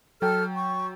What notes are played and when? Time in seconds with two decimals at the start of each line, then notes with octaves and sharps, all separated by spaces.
0.22 F#3 A4 G5 F6
0.56 C#6